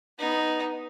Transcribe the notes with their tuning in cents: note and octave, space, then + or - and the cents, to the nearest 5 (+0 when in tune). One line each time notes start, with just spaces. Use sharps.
B3 +0 D#4 +0